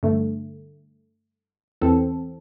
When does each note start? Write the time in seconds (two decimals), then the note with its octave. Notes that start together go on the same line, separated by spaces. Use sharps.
0.03 G2 D3 A3
1.82 E2 E3 C4 A4